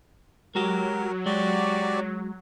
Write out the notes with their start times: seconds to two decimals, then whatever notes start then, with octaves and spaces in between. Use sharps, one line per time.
0.55 F#3 G#3 F#4 G4 A#4
1.26 G#3 F#4 G4 D5